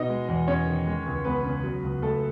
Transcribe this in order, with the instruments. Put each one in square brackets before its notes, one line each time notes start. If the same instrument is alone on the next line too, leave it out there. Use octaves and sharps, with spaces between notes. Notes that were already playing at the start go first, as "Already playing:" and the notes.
Already playing: [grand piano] B2 D#4 D#5
G#3
E2
E2 C#4 C#5
D#3
G#3
C#2
C#2 B3 B4
C#3
F#3
C#2
C#2 A3 A4